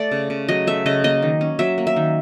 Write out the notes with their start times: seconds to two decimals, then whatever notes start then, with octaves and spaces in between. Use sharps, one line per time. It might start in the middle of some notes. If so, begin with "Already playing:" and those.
Already playing: A3 D5
0.12 C#3
0.30 C#3
0.48 F#3 D#5
0.67 A3 E5
0.86 C#3 D#5
1.04 A#3 D#5
1.22 D#3
1.41 C#4
1.59 F#3 E5
1.78 A#3
1.87 E5
1.96 D#3